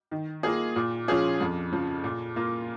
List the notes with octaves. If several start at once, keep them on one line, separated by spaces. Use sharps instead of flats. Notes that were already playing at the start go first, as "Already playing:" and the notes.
D#3
A#3 F4 G#4
A#2
F3 C#4 F4 G#4
F2
C#3 F3
A#2
A#3 F4